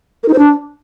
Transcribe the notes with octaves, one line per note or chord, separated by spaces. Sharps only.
A#4
D#4
C5
D4